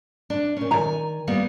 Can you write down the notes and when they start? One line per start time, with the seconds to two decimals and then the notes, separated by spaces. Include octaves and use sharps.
0.30 D4
0.57 A#2 C#4
0.71 D#3 G#5 A#5
1.27 G3 A#3 B3